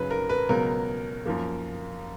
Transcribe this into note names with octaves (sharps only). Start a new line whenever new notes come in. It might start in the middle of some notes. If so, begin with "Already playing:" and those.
Already playing: F#2 C#3 F#3 B4
A#4
B4
C#2 B2 F#3 B3 A#4
F#2 F3 A#3